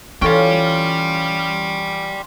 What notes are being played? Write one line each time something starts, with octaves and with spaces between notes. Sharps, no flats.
E3 C#4 F4 A4 D5 G5 C#6